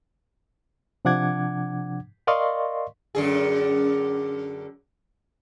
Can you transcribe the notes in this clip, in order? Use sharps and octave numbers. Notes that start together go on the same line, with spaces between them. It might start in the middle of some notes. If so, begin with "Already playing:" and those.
C3 F3 D4 F#5 D6 G#6
A#4 D5 D#5 F5 C6 C#6
F#2 D3 G#4